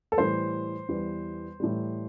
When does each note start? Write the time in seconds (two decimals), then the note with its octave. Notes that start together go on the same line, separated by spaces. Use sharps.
0.12 A4
0.17 A2 E3 G3 C5
0.89 E2 E3 G3
1.60 A2 E3 G3